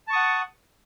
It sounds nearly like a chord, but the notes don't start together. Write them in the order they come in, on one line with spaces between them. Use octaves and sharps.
A5 C#6 D#6 F#5